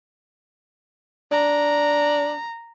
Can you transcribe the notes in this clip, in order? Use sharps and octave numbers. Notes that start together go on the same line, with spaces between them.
D4 A#5